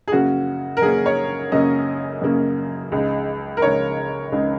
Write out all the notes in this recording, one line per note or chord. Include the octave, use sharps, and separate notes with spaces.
G#4
F#2 C#3 A#3 C#4 F#4
A#4
F#2 C#3 A#3 C#4 G#4
C#5
F#2 C#3 A#3 C#4 D#5
F#2 C#3 A#3 C#4
C#2 C#3 G#3 D#4
A#4
C#2 C#3 G#3 D#4 C#5
C#2 C#3 G#3 D#4